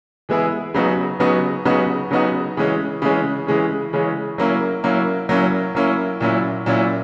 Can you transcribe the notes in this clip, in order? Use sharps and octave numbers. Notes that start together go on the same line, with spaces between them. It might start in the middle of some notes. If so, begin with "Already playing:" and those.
E3 G#3 B3 E4 G#4
C#3 F#3 B3 D#4 F#4
C#3 F#3 B3 D#4 F#4
C#3 F#3 B3 D#4 F#4
C#3 F#3 B3 D#4 F#4
C#3 E3 G#3 C#4
C#3 E3 G#3 C#4
C#3 E3 G#3 C#4
C#3 E3 G#3 C#4
F#3 A#3 C#4 E4
F#3 A#3 C#4 E4
F#3 A#3 C#4 E4
F#3 A#3 C#4 E4
A#2 F#3 C#4 E4
A#2 F#3 C#4 E4